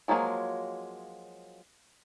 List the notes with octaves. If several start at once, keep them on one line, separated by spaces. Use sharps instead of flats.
F3 F#3 G#3 A#3 G#4